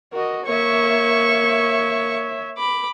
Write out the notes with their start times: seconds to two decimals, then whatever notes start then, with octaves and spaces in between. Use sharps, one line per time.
0.13 F#4 A#4 D#5
0.45 A#3 C#5 E5 C#6
2.58 B5 D6